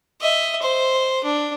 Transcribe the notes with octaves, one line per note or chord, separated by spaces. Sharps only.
D#5 E5
C5
D4